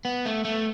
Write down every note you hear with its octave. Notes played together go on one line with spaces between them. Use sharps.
B3
A3
A3